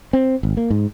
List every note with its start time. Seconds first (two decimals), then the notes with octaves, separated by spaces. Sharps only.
0.13 C4
0.43 G#1
0.57 A#3
0.70 G#2